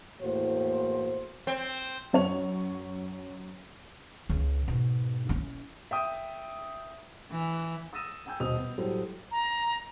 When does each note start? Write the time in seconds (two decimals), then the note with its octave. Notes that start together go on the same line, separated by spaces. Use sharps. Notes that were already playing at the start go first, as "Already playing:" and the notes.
0.20 E2 A2 A#3 F#4 C5
1.47 C4
2.13 F#2 C#5 F7
4.29 C#2 C#3
4.68 G#2 B2
5.29 C#4 E4
5.91 E5 G5 D#6
7.32 E3
7.93 D#6 E6 A6 A#6 D#7 E7
8.26 G5 G#5 E6 G6
8.40 D#1 B2 C5 D#5 D#6 F7
8.58 B3
8.78 A2 F#3 G3 A4 C5
9.31 A#5